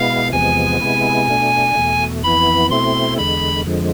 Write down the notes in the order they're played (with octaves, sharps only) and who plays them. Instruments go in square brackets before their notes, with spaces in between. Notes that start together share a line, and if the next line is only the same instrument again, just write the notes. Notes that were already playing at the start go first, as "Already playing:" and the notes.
Already playing: [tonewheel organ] B2 G#3 B3 E4 [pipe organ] F5
[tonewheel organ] E2 C3 F3 G#3 B3 [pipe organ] G#5
[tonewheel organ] C3 G#3 B3 E4
B2 A3 D4
E2 B2 A3
[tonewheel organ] F2 E3 B3 E4 [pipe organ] B5
[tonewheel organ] B2 A3 C4 E4 [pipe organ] C6
[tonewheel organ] E2 D3 G#3 [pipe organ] B5
[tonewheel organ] F2 D3 F3 G#3